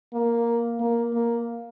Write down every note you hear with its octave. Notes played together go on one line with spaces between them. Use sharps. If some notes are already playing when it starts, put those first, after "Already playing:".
A#3
A#3
A#3